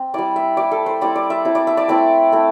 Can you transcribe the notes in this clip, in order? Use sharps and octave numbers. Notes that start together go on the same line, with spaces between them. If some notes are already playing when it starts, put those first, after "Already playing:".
Already playing: C4
G3 E4 D5
E5
G3 E4 D5
A4
C5
G3 C4 E4 D5
D5
E5
G3 C4 E4
D5
E5
D5
A3 C4 E4 D5
A3 C4 E4